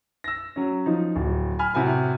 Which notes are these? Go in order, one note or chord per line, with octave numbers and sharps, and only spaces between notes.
E6 A#6
F#3 C#4
F3 D#4
D1
G#5 B5 F6
A2 C3 F#4 G#5 B5